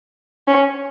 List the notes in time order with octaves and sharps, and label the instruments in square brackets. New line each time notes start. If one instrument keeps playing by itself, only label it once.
[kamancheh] C#4